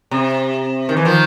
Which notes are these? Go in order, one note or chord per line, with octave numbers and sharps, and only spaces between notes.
C3
D#3
E3
D#3 F3